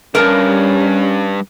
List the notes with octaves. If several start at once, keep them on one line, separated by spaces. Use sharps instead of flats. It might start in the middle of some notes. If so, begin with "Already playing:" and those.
C#2 G2 G3 C#4 A#4 A5